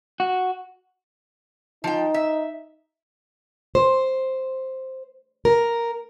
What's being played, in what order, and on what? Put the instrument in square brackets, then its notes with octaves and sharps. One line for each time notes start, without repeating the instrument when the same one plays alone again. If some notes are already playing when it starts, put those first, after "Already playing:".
[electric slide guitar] F#4
[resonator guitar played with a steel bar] F3 G5 [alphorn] D#4
[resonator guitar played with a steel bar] E5
[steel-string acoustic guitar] C5
A#4